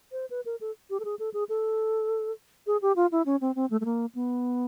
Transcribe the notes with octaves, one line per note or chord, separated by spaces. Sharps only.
C5
B4
A#4
A4
G4
A4
G#4
A4
G#4
A4
G#4
G4
F4
E4
C#4
C4
C4
A3
A3
A#3
B3